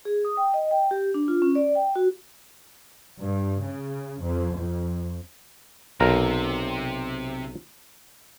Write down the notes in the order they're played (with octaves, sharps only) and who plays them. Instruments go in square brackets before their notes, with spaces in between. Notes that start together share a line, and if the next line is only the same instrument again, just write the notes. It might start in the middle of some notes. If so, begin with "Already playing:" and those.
[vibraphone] G#4
D#6
G5
D#5
G5
G4
D4
F4
C#4
D5
G5
F#4
[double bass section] G2
C#3
F2
F2
[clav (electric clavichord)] B1 A#4 A#5 [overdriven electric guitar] C3